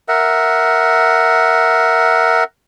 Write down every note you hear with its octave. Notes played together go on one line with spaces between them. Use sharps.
A#4 E5 F#5